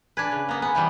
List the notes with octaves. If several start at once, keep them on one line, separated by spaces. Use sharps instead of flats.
D4 B4 G#5 G#6
C#3
A#3 B3
B3 G#5 B5
C3 E3 G3